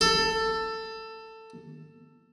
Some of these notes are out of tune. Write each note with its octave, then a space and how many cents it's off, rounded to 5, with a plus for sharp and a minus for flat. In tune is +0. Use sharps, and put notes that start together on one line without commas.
A4 +15